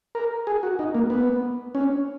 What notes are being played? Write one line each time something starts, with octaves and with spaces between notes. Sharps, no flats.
A#4
G#4
F#4
D#4
A#3
B3
C#4